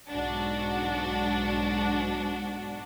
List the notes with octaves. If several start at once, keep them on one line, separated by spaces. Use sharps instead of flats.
B1 G#2 D4 F#4